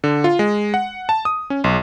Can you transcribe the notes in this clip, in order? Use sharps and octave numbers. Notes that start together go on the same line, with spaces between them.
D3
F4
G#3
F#5
A5
D#6
C#4
B1